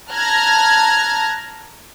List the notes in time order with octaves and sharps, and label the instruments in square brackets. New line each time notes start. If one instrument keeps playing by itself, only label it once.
[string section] A5 A#5 F6 F#6 G#6 A#6